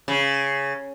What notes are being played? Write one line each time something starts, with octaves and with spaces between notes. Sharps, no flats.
C#3